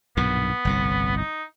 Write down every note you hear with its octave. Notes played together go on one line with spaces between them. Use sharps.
B1 G2 A#2 B3
G1 C2 A2
D#4